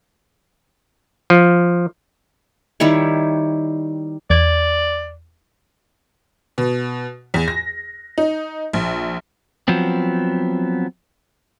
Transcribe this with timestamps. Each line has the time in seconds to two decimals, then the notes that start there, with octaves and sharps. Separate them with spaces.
1.30 F3
2.80 D#3 G3 E4 C#5
4.30 E2 D5 G#6
6.58 B2
7.34 E2
7.48 A#6
8.18 D#4
8.73 A#1
9.68 F3 F#3 B3 C4